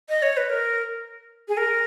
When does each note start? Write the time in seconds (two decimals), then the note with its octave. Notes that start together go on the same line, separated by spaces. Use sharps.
0.09 D#5
0.22 C#5
0.37 B4
0.49 A#4
1.48 G#4
1.57 A#4